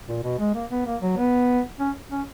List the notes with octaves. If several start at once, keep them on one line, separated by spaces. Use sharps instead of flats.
A#2
B2
G#3
A#3
B3
A#3
F#3
B3
C#4
C#4